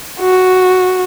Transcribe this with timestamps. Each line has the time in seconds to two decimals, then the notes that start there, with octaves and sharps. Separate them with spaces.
0.21 F#4